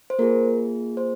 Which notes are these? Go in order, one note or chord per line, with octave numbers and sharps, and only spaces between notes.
C5
A#3 F4 G#4 A#4
C5